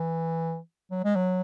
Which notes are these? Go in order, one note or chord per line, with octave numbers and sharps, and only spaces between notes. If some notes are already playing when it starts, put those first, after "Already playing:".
Already playing: E3
F#3
G#3
F#3